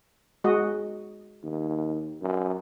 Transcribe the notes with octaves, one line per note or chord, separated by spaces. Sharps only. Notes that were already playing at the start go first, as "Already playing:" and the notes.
G#3 F#4 D#5
D#2
F#2